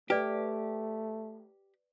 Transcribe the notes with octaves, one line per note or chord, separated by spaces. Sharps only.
A3 G4 B4 D5